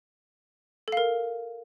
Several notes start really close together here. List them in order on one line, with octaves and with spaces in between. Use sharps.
A4 F5 A#4